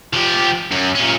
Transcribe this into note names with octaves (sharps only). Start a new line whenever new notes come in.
F3 G4
F#2
A#2 C#4